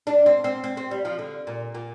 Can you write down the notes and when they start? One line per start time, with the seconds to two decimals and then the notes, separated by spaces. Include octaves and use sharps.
0.07 D4
0.26 C4
0.44 C4
0.64 C4
0.77 C4
0.91 G3
1.05 F3
1.19 D3
1.47 A#2
1.75 A#2